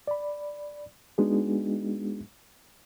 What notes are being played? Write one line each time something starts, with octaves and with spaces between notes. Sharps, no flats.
D5 B5
G#3 B3 D4 D#4 F#4 G#4